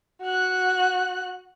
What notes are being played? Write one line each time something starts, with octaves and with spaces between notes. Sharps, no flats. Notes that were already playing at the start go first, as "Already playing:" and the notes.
F#4 F#6